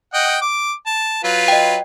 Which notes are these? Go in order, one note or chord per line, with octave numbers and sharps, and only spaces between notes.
D#5 F#5 G5
D6
A5
F#3 F4 B4
D#5 G5